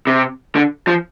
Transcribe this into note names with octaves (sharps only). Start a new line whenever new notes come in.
C3
D3
F3